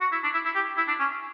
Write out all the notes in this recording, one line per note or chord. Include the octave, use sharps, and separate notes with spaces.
F#4
E4
D4
E4
E4
G4
E4
D4
C#4